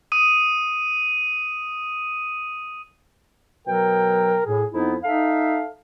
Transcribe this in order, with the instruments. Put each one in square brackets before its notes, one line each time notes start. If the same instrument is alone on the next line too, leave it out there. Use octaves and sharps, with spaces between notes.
[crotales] D#6 D#7
[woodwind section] B2 F#3 G5 [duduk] A#4
[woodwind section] A2 [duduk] G#4
[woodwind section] F2 B3 E4 [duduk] D#4
[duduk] D#4 [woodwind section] A4 E5 F5